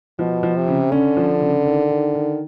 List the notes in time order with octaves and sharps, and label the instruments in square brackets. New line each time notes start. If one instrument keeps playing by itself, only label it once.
[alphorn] B2 [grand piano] F3
[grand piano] F3
[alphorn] C3
[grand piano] C#3
[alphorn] D3 [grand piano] C#4
[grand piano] F3
C#3
D#3
D#3
D#3